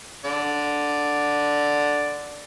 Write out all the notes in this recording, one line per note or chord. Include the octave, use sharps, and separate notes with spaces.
D3 D5